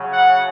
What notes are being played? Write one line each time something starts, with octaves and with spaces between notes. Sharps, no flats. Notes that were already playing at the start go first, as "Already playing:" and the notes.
Already playing: C#3 F#3 C#4
F#5